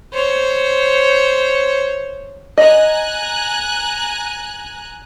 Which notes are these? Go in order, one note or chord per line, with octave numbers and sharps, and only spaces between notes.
C5 C#5
D#5 G#5 A#5 F#6